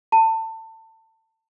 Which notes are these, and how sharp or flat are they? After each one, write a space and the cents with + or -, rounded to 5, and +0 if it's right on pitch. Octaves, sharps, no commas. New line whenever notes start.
A5 +25